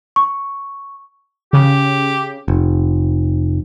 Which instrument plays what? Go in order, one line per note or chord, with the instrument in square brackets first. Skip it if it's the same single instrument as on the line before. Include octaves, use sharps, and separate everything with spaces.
[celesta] C#6
[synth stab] C#3 [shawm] G4
[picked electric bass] F1